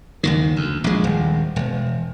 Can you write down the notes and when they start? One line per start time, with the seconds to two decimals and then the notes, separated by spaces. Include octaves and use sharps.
0.23 F#1 D#2 D#3
0.56 D2
0.84 A#1 G#3
1.04 D#1
1.56 E1